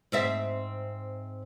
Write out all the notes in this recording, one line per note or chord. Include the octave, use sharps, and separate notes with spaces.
G#2 C4 E5